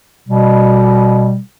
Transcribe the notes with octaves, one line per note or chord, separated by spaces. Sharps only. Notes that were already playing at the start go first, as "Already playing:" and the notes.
B2 G3